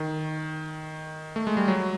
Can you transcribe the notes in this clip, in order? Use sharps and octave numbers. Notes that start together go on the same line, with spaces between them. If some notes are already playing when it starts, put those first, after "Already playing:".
Already playing: D#3
A3
G#3
G3
F#3